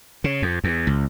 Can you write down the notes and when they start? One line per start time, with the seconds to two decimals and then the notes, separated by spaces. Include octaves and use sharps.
0.24 C#3
0.42 F2
0.64 E2
0.87 C#2